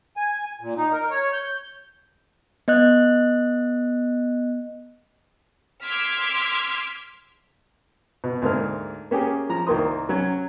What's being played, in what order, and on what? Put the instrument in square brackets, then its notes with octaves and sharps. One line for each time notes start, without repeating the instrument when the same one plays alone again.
[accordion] G#5
A#2
D#4
A#4
C#5
G6
[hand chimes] B3 D#5 F#6
[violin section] C6 D6 E6 F6 G#6 B6
[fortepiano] B2
D2 G#2 A#3 F6
A#3 C#4 G4 G#4
F3 A#5
C2 D#3 A#3 C6 D#6
F#3 C#4